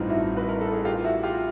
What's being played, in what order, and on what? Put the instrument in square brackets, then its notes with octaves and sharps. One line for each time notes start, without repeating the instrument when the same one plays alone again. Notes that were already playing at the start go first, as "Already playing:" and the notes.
Already playing: [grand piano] A1 G2 E3 G3 C4 [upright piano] D#4 F4
[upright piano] E4 F#4
B4
A#4
A4
G#4
F4 G4
E4 F#4
F4 G4